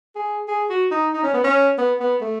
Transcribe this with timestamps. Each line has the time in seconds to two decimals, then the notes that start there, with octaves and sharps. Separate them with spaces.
0.16 G#4
0.48 G#4
0.70 F#4
0.91 D#4
1.14 D#4
1.23 C#4
1.34 B3
1.44 C#4
1.78 B3
2.00 B3
2.21 A3